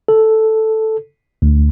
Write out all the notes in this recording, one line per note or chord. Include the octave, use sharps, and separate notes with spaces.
A4
D2